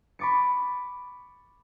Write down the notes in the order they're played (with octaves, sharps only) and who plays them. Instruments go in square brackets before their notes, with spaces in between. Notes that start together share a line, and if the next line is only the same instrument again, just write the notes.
[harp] B5 C#6 D6 A6 C#7